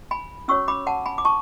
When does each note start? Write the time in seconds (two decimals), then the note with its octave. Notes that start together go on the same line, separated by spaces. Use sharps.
0.11 G#5 B5
0.48 C#4 F#4 C#5 C#6 E6
0.68 B5 D6
0.87 F#5 A5
1.06 G#5 B5
1.18 D6
1.25 A5 C#6